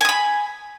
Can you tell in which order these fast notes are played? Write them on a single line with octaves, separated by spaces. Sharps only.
G#5 D#6 B5